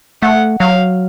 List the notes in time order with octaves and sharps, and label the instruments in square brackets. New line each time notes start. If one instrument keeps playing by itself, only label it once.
[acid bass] A3 [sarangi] F#5
[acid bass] F#3 [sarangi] F5